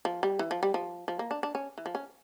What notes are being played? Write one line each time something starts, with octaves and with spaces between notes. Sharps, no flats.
F3
G3
E3
F3
G3
F3
F3
A#3
D4
D4
C#4
E3
F3
C#4